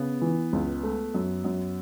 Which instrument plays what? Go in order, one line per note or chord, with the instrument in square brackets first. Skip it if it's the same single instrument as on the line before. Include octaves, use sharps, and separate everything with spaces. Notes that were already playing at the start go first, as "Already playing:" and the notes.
Already playing: [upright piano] C#3 [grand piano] B3
[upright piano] E3
C#2
A3
F#2
F#2